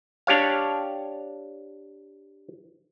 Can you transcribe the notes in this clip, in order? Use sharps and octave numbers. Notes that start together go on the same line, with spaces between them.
D4 G4 C#5 F5